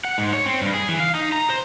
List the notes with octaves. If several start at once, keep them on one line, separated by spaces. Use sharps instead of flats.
F#5
G#2
C#5
C4
G2
G#4
E3
F5
D#4
A#5
C5